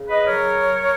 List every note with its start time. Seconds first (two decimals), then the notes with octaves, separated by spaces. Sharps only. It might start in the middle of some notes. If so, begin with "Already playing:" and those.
Already playing: C#3
0.09 B4 D#5
0.25 F#3 A#4 C#5